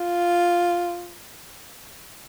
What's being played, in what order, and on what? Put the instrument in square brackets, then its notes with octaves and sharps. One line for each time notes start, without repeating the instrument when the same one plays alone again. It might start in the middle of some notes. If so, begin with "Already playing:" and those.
Already playing: [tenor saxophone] F4